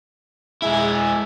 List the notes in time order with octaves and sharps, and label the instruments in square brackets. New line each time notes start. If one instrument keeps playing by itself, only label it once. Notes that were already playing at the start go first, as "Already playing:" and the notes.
[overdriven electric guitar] G#3 E4 [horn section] G#4 E5 G#5